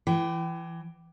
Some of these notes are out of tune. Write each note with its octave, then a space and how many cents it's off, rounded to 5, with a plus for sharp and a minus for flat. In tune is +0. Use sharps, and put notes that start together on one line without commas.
E3 +30 G5 -25